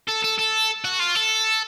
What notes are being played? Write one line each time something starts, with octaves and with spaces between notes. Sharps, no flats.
A4
A4
A4
F#4
F4
A4